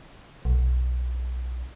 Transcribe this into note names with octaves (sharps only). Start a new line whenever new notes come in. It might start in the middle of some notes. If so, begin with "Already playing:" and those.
B1